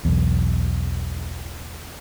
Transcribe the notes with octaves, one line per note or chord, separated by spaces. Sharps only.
B1 E2